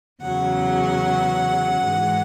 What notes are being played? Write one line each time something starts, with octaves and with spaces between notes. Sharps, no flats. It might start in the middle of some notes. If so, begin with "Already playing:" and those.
E2 C#3 F#3 F#5
G#2 E3 G#3